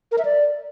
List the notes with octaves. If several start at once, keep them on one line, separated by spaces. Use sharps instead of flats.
A#4
E5
D5